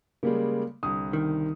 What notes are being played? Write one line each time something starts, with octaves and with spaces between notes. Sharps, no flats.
C#3 G3 G#3 A#3
C2 D3 D#6
D#3